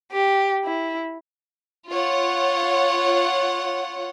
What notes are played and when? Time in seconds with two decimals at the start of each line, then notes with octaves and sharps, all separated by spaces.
0.12 G4
0.64 E4
1.90 F4 C#5 F#5